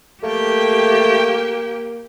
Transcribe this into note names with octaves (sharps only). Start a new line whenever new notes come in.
A3 A#3 G4 G5